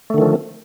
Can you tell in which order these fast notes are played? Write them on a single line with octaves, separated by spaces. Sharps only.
A3 D3 D#3 F3